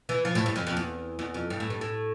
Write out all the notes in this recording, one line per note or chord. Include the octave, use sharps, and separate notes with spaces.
E3
F3
A2
G2
F2
F2
E2
E2
F2
G2
A2
G2
A2